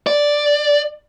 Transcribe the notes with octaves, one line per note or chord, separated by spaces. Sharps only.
D5